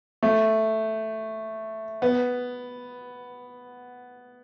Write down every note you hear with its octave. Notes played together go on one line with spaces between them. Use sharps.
A3
B3